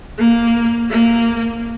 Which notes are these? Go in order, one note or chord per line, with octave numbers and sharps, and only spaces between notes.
A#3
A#3